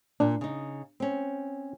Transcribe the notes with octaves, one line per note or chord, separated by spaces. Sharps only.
A#2 D4
C#3 D#4
C4 C#4